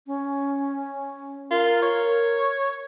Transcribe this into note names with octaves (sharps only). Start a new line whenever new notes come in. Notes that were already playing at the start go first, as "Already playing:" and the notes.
C#4
F4 A#4
C#5